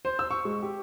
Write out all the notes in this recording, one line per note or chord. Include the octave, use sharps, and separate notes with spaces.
C5
E6
C#6
G#3
G4